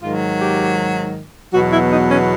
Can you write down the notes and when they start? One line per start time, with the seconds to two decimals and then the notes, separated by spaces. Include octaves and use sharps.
0.01 G#2 D#3 F#3 F4
0.40 G4
1.54 E2 B2 F#3 F#4
1.73 E4
1.92 D#4
2.11 C#4